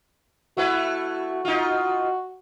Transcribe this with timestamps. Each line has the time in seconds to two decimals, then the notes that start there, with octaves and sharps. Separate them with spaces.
0.57 A3 E4 F#4 B4
1.45 D#4 F4